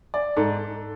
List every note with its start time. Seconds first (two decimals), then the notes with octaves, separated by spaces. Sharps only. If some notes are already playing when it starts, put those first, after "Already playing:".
0.14 D5
0.36 G#2 A4